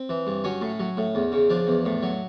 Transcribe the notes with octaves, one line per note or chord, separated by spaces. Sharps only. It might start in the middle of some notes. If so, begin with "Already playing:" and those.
Already playing: C4
E3
G2
F#3 C#4
A2
F#3
A2
E2
C#3
F3 D4
E2
A2
F#3